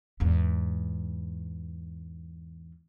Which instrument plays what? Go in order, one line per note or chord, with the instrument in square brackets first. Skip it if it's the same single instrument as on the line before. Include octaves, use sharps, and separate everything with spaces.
[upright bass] E2 G#2